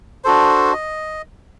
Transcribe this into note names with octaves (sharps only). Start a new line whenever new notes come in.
D4 F#4 A4 C5
D#5